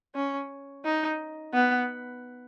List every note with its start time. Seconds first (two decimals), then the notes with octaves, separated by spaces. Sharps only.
0.15 C#4
0.85 D#4
1.54 B3